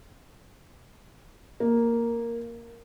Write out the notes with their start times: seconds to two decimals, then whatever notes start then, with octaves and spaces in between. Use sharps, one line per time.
1.60 A#3